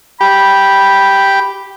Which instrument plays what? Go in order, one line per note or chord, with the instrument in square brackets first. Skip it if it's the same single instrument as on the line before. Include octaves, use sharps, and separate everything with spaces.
[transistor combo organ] G4 G5 [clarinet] B5